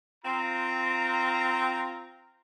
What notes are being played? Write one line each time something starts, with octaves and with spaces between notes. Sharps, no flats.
C4 F4 A#5